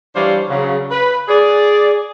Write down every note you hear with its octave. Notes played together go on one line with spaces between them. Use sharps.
E3 G3 D4 C5 C#5 F5
C#3 F#3
B4 B5
G#4 D5